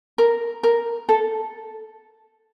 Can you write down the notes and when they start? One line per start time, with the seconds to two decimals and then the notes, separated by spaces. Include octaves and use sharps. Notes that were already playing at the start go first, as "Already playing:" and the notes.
0.18 A#4
0.63 A#4
1.09 A4